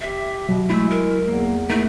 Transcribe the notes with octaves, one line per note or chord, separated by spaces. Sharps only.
G4 E5
B2 F#3
G#3 A3 E4 E6
A#4
E2 A#3
A3 A#3 D#4 E4